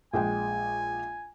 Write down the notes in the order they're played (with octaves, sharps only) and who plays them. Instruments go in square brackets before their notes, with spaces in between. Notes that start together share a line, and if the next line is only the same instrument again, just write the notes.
[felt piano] A#1 G#3 G5 [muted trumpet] G#5